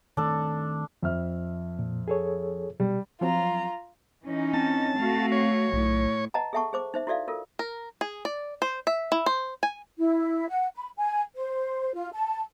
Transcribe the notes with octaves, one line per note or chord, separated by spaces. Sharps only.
D#3 A3 C4 D4 A4
F2 E5 F6
A#2
G#4 A4 C#5
B2 G3
F3 F#3 C4 F4 A#5
E3 C#4 D#4
C4 A5
A3 F#4 F5
C#5
B1 A2
B4 D#5 F#5 A5 A#5
G#4 A4 E5 F#5 A5 C#6
G#4 C5 D6
D#4 C5 E5
E4 F#4 A4 D5 E5 F5
F4 A4 A#4
A#4
G#4
D5
C5
E5
E4
C5
G#5
E4
F#5
B5
G#5
C5
F4
A5